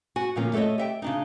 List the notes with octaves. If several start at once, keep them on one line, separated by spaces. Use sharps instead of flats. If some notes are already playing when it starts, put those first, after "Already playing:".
F#4 G#5
A#2 D3 F3 A#3 C#4 F4
A3 A4 B4 C#5 D#5
G4 E5 G5
C#3 D4 D#4